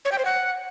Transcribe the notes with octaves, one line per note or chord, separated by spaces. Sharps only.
C#5
G5
C5
F#5